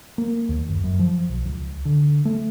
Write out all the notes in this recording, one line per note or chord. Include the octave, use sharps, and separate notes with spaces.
A#3
D#2
F#1
F#2
F3
B1
C#2
D3
A3